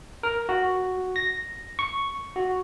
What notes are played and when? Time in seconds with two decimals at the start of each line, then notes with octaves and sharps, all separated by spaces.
0.23 A#4
0.49 F#4
1.16 A#6
1.79 C#6
2.36 F#4